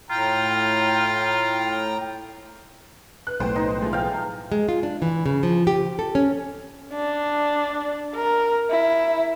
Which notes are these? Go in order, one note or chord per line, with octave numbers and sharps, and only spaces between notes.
A2 F4 G5 A#5
B4 F#6
B1 A2 B3 C5 G5
D#4
E3 F3 G#3
F5 G5
A#5
G#3
F4
D4
E3
C#3
F3
G4
A4
C#4
D4
A#4
E4